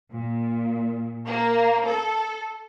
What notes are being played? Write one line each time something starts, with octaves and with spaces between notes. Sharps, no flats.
A#2
A#3
A4